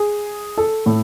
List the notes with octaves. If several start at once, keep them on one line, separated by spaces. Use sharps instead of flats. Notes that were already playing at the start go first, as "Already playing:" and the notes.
Already playing: G#4
A4
A2